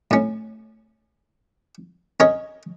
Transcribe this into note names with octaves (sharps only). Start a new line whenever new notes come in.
A2 C#4
C#4 A#4 C#5 D#5